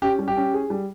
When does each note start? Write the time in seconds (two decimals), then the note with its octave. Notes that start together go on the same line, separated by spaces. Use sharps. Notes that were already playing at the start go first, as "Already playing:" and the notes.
0.02 C#4 G4
0.19 G3
0.28 G4
0.36 C#4
0.54 G#4
0.70 G3